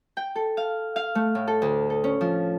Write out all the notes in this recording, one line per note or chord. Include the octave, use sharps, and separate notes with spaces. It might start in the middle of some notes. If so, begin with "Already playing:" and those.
G5
A4
F5
F5
A3
A2
A4
D2
A4
C#4
F3